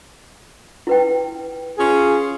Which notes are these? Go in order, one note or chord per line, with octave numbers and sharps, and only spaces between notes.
E4 B4 G5
C#4 F4 G#4